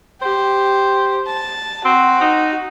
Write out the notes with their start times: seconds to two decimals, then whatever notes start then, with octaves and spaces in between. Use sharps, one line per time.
0.22 G4 C5
1.27 A5
1.85 C4 F#4
2.21 D#4